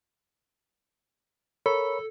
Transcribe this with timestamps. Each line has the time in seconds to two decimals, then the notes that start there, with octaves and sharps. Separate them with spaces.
1.66 A4 A#4 C#5 B5